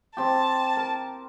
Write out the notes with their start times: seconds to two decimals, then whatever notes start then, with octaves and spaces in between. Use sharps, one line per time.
0.17 C4 G4 A5
0.76 A#4